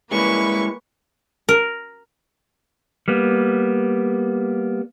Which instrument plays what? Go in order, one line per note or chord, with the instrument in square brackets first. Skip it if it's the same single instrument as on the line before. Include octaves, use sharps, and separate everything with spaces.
[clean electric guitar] G3 G#3 C#4 [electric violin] A#3 B4 [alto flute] E4 [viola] C#6
[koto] A#4
[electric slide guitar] G3 A#3 B3